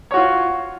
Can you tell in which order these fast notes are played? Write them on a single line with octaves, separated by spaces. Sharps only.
C#5 F#4 F4